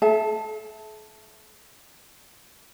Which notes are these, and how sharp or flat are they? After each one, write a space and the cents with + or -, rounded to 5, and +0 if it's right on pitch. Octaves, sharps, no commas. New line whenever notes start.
A4 -45 E5 +0 A5 +0